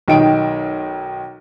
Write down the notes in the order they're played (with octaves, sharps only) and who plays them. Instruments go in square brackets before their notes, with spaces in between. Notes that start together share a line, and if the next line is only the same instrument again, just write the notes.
[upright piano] B1 D#3 D#4 G5 D7